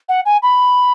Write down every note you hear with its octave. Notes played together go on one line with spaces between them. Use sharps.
F#5
G#5
B5